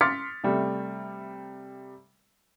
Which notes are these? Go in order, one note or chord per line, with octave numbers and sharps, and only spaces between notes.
C6 D6 F6 A6 B6 C#7
C3 G3 A3